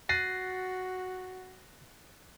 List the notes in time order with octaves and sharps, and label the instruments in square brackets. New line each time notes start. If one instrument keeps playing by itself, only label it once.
[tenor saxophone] F#4 [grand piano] F#6 A6 D#7 [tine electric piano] A#6 C7